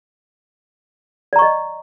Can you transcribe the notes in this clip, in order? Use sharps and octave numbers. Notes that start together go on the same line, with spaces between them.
D5 D#5 A#5 C#6